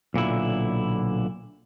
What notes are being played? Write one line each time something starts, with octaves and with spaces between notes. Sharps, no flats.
B1 A#2 D3 E4